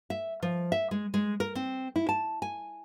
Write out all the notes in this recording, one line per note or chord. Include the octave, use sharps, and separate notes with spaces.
E5
F3
E5
G#3
G#3
A#4
C4
E4
A5
G#5